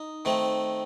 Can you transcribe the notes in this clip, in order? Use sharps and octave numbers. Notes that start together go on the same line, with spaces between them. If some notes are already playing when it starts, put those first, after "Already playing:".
Already playing: D#4
D#3 A3 C4